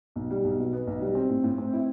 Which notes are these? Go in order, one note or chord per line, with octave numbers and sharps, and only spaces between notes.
B1
G3
B1
B2
B3
B1
G3
C4
A2
A2
C4
E4